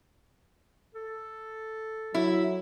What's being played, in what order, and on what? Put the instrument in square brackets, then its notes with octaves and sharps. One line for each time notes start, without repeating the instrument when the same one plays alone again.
[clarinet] A4
[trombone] F#3 [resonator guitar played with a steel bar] E4